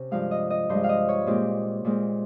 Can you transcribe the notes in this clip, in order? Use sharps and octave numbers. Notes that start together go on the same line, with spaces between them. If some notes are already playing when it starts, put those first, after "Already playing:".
Already playing: C3 C#4
G2 F3 G#3 F5
D#5
D#5
G2 F3 G#3 C5
F5
D#5
C#5
A#2 G#3 C4 G4
A#2 G#3 C4